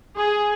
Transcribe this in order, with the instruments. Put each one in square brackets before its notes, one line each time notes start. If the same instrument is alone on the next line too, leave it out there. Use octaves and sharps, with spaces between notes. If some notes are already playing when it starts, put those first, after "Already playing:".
[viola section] G#4